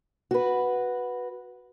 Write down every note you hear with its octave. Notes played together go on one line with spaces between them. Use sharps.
F#4 B4